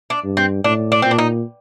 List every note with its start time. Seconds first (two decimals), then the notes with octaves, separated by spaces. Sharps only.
0.10 D4
0.24 G2
0.37 C4
0.64 A2 D4
0.92 D4
1.02 A#2 C4
1.11 D4
1.18 D#4